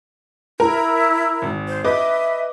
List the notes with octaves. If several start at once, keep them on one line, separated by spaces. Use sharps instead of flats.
E4 A#4
G#1
C5
B4 D#5 E5 D6